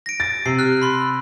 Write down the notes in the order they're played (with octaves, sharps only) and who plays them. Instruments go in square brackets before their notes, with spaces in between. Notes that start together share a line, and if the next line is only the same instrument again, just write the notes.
[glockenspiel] A#6 D7
[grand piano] A6
[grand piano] C3 [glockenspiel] C7
[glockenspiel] F6 F#6
B5 C6